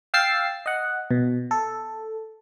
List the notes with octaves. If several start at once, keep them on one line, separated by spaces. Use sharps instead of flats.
F5 G5 E6 A6 C7
D#5 F#5
B2
A4